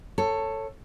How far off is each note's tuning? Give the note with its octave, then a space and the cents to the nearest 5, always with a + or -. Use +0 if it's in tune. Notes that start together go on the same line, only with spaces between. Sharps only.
A4 +15 C#5 -5